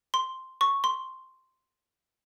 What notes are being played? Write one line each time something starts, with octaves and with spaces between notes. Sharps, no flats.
C6
C#6
C6